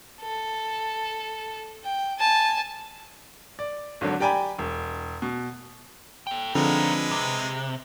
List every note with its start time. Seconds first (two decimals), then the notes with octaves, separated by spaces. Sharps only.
0.21 A4
1.84 G5
2.19 G#5 A5
3.59 D5
4.01 G#1 D3 F#3 D4
4.20 G4 D5 G5 G#5 A#5 B5
4.59 E1
5.22 B2
6.27 A4 G5
6.55 D3 F3 G#3 C4 D#4 F4 B4
7.11 C3 D6